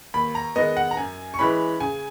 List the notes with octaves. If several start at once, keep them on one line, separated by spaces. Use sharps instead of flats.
D#2 B5
A#5
D#3 G#3 B3 D#5
F#5
A#5
F#2 G#5
C#6
E3 G#3 C#4 B5
C#3 G#5